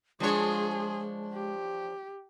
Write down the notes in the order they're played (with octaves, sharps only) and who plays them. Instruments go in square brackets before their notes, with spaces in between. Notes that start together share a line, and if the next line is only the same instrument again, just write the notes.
[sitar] F3 D4 C#5 [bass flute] G#3 [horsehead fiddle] G#4
[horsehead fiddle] G4